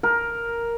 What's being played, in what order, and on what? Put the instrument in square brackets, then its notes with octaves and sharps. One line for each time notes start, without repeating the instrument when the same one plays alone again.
[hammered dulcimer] A#4